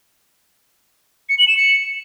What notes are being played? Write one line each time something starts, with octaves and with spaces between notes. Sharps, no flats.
C#7
F#7
E7
C#7